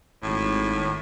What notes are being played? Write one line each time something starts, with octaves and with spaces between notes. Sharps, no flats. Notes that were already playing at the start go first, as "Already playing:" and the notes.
G#1 A2